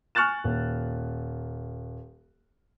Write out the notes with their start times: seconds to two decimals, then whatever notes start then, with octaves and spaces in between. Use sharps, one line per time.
0.15 G#5 C#6 F6 F#6 A6 E7
0.44 D#1